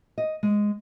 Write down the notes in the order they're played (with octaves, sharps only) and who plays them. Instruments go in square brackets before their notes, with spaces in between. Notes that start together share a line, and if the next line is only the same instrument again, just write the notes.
[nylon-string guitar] D#5
G#3